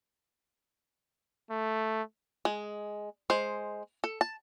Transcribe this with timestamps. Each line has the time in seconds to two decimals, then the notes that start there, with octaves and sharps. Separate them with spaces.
1.50 A3
2.45 G#3
3.30 G#3 C5
4.04 A4
4.21 A5